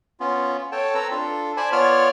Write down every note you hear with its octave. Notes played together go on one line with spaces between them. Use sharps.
B3 C#4 F4
A4 C#5 G5 A5
C4 A4 B4 A#5 E6
D4 F4 A4
C5 D5 G#5 A5 B5
B3 F4 C#5 D5 F6